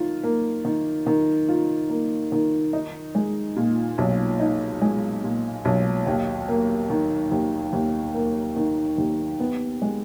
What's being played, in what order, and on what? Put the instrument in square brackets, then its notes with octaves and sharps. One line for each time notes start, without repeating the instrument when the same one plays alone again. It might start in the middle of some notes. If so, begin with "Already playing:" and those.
Already playing: [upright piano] D#3 F4
A#3
D#3
D#3
F4
A#3
D#3
D#4
G#3
A#2
B1
D#4
G#3
A#2
B1
D#2
A#3
D#3
D#2
D#2
A#3
D#3
D#2
B3
G#3